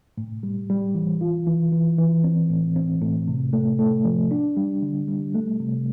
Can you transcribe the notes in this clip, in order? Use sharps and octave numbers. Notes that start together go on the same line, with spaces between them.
A2
G3
G3
E3
F4
E3
E3
E3
C4
A2
C4
A2
C3
A3
A3
F3
D4
G3
D3
G3
A3
C3